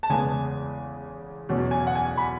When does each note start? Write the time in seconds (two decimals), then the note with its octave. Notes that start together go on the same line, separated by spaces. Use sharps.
0.03 A5
0.10 E2 C#3 G#3 B3 G#5
1.49 E2 B2 F#3 C#4
1.71 G#5
1.87 F#5
1.95 G#5
2.17 B5